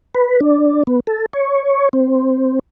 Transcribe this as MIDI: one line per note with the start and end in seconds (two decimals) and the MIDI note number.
0.15 0.40 71
0.40 0.83 62
0.87 1.00 59
1.07 1.26 69
1.33 1.89 73
1.93 2.59 60